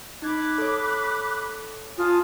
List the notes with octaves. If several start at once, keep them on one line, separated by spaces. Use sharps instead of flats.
D#4 B5 D6 F#6 G#6
A4 C#5
F4 G#5 A5 D#6